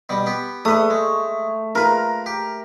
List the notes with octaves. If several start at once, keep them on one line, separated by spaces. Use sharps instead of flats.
B2 G3
B3 G4
A3 B4 D#6
G#3
F4 A#4 B4
G4